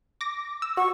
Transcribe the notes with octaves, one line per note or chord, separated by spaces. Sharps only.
D6 A#6
E6
F#4 C#6